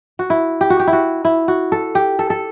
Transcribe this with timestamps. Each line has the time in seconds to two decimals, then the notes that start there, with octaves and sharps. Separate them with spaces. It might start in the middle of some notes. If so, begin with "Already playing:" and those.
0.19 F#4
0.30 E4
0.61 G4
0.70 F#4
0.80 G4
0.87 E4
0.93 F#4
1.25 E4
1.48 F#4
1.72 A4
1.95 G4
2.19 A4
2.30 A4